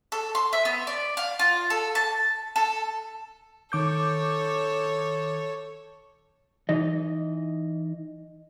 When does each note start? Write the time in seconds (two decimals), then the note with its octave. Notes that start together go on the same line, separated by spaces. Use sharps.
0.12 A4
0.35 C6
0.53 E5
0.65 B3
0.87 D5
1.17 F5
1.39 F4
1.70 A4
1.95 A5
2.56 A4
3.72 D#3 A4 C#5 D6 G6
6.69 E3 D#4 D#5